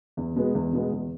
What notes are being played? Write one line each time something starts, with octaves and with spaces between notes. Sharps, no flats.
E2
B2 G#3 B3
E2
B2 G#3 B3
E2